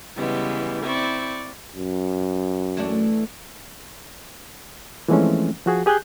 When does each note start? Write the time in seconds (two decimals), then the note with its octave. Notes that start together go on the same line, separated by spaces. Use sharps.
0.17 C#3 E3 G3 G#3 B3
0.83 C4 E4 D5 C#6
1.76 F#2
2.77 E3 A3 D4
5.08 E3 F3 G#3 A3 C4 C#4
5.66 F3 F#4 G#4
5.86 G4 G#4 G#5 F#6 G6